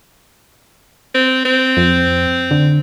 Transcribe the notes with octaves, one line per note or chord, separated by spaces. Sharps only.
C4
C4
F2
D3